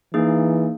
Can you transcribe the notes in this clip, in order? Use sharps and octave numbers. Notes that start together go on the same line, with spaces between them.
E3 A#3 D#4 G#4